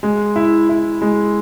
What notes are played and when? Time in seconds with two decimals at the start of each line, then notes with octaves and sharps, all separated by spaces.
0.03 G#3
0.36 E4
0.69 E4
1.02 G#3